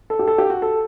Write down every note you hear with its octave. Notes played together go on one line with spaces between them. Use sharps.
A4
G4
A4
G4
F#4
A4